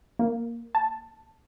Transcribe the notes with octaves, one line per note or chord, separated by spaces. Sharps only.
A#3
A5